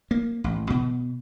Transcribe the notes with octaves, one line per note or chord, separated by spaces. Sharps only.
A#3
A1
B2